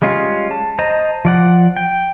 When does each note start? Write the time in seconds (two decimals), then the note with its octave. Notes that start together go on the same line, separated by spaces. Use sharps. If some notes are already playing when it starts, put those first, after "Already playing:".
0.02 G3 G#3 C#4 F4
0.51 A5
0.79 C5 D#5 A5 A#5
1.25 F3 D5 F#5
1.76 G5